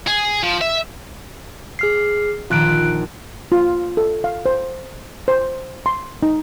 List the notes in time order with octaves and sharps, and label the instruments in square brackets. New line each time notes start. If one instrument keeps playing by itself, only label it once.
[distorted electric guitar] G#4
F3
E5
[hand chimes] G#4 F6 C7
[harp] A#1 D#3 [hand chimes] F4 F#6 D7
[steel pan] F4
A4
F5
C5
C5
C6
D#4